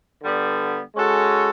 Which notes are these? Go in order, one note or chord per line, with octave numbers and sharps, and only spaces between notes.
D3 G3 B3
G#3 C#4 F#4 A4